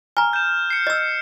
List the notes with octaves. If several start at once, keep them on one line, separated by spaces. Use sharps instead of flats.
G#5 A#5 F6
G6 E7
C7 C#7
D#5 E6